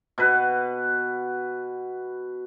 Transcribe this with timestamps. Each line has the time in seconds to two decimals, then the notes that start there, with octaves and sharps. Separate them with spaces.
0.18 B2 B4